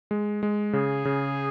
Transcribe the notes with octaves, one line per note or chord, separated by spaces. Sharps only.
G#3
G#3
C#3 G#4
C#3